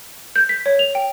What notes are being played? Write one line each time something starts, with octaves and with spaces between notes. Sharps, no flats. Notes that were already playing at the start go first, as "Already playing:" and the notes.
G6
B6
C#5
F7
G5